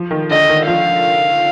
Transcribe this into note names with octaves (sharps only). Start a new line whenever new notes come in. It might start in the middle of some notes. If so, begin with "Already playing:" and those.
Already playing: F3
D#3
D3 D#5
D#3
F3 F5